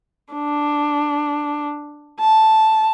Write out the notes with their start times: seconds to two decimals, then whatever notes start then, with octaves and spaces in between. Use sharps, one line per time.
0.34 D4
2.20 A5